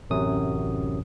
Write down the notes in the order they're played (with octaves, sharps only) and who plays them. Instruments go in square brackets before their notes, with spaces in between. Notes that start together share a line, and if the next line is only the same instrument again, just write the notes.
[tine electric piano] A1 F#2 C3 F#3 D#6